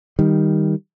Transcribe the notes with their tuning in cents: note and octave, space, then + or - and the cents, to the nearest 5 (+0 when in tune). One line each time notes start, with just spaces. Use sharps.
D#3 +0 G3 +0